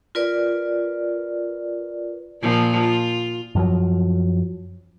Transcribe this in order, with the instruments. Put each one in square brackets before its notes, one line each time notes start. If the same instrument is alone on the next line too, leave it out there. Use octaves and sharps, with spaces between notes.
[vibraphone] F4 A#4 B4 D5
[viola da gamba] A#2 F3 F4
F4
[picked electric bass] F#2 F3 F#3